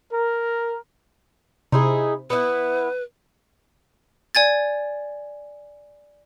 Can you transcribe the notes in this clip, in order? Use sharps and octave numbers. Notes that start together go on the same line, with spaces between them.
A#4
C3 D#4 E4 G#4
B3 E4 B4
D5 G#5 G#6 A6